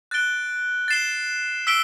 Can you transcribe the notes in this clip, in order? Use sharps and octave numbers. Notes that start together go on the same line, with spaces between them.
F#6 A6 D7 G7
A6 C7 E7 G7
E6 B6 D7 G7